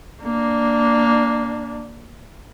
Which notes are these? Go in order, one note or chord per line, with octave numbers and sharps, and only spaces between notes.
A#3 D4